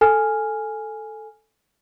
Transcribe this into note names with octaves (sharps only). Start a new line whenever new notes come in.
A4 G#5 F6